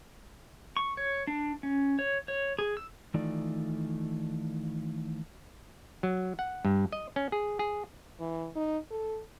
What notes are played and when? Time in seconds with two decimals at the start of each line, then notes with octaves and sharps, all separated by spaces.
0.77 C#6
0.97 C#5
1.27 D4
1.63 C#4
1.99 C#5
2.28 C#5
2.59 G#4
2.77 E6
3.14 D#3 E3 A3 D#4 F4 D5
6.03 F#3
6.39 F#5
6.65 G2
6.92 D#5
7.16 C#4
7.32 G#4
7.59 G#4
8.20 E3
8.56 D#4
8.91 A4